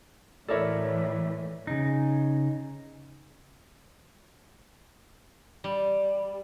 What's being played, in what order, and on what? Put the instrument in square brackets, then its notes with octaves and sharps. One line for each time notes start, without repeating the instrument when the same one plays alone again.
[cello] A2 E3 [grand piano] A3 E4 D5 [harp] A4 A#4 C#5
[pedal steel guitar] C#3 D#4
[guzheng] G3